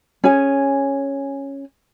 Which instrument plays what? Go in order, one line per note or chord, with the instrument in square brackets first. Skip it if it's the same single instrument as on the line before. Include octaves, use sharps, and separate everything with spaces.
[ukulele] C#4 G#4 G#5